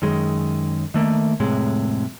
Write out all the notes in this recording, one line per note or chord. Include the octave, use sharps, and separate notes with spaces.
F#2 D#3 G#3
D#3 A3 A#3
F1 A2 C3 G#3